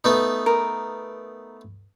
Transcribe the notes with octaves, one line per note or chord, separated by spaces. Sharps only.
A3 B3 D#4
A#4